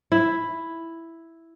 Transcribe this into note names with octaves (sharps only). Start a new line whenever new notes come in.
E4